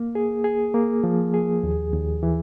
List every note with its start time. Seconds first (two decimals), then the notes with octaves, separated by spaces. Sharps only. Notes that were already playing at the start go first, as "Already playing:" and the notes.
Already playing: A#3
0.15 G#4
0.44 G#4
0.74 A#3
1.04 F3
1.34 G#4
1.63 D#2
1.93 D#2
2.23 E3